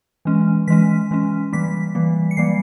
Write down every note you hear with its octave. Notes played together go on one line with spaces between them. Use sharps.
E3 G#3 C#4
E3 G#3 C#4 B6
E3 G#3 C#4
E3 G3 A#3 B6
E3 G3 A#3
C#7
E3 G3 A#3 C7